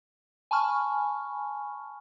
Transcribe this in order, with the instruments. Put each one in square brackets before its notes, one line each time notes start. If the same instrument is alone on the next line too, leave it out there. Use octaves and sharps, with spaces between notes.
[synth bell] G#5 A5 B5 C#6 F6